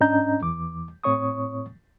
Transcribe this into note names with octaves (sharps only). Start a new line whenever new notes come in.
G#2 C#4 D4 D#5 A#5 G6
E2 E3 D6
A2 C4 C#5 C#6 D#6